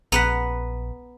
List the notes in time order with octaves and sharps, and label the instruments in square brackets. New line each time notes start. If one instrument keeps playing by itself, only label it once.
[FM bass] A#1 [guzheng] B3 F#5 [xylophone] A#5 B6